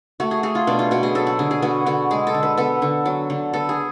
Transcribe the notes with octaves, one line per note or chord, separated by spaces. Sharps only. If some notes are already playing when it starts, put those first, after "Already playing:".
A3 F#4
G#4
A3 G#4
F4
B2 D4
F4
B2 F#4
G#4
F#3 A4
F#4
D3 G#4
G#4
B3 F#4
D3 F#4
G#3 G#4
A4
D3
B4
B3 A4
D3
F#3
D3
B3 A4
G#4